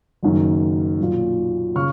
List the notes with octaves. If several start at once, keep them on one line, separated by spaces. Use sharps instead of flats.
F#1 F#2 D#3
B1 A#2
C#3 C#6 F6